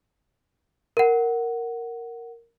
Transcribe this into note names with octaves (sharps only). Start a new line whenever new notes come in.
A#4 F#5